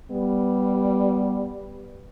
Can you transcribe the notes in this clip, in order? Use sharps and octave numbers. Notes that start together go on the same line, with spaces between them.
G3 B3